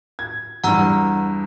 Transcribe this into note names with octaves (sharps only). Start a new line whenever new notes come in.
G#6
E2 G2 F#5 A#5 E6